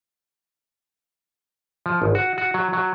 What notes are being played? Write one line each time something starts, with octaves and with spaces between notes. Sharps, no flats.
F3
G#1
F#4
F#4
F#3
F#3